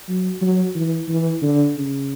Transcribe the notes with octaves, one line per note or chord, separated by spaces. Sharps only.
F#3
F#3
E3
E3
D3
C#3